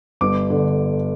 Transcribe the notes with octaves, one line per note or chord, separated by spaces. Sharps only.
G1 D6
D3